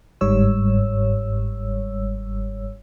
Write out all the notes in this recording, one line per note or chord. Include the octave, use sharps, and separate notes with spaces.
G1 G#2 G3 C#5 E6